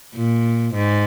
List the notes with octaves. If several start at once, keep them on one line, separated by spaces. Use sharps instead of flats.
A#2
G#2